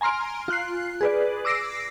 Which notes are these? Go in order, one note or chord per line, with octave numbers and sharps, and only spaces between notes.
G#5 A#5 C6 F6 D7
F4 F#6 C7
G#4 B4 D5
D6 E6 A#6 C7 D7